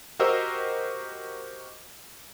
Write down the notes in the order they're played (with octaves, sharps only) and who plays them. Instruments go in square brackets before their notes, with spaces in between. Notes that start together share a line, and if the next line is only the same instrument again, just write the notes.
[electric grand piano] F#4 G4 A#4 C5 D#5 E6